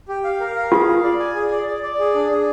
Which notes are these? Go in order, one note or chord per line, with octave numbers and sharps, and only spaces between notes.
G4
F5
A#4
F5
F4 G#4
F5
D5
G#5
G#4
D5
D5
D5
G#4
D4
G#4